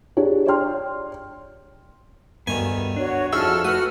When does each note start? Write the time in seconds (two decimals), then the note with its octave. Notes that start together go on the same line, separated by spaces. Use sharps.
0.17 D4 G4 G#4 C#5
0.47 C#5 D5 G5 C6 F6
2.47 D2 G2 D#3 B3 G#5
2.96 D4 F#4 C#5
3.33 F2 D#4 E4 F#4 G#4 A4 E6 F6
3.65 A3 F#4 B4 D#6 F6